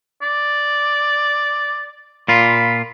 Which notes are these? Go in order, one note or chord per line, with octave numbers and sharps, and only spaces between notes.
D5
A#2 F4 B5